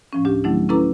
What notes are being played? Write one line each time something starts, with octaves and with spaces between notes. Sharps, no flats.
A2 F3 C#4
D2 D4 G4
D#3 F#3 A3 C4 D4 E4
C#4 E4 A4 B4 A#5 D6